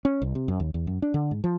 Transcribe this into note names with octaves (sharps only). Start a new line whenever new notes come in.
C#4
C2
C3
F#2
D#2
E2
F#2
D4
D3
G#2
F3